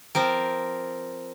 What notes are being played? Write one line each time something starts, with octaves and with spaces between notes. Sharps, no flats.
F3 C4 A#4